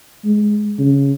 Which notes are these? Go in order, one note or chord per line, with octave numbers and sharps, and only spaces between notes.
G#3
C#3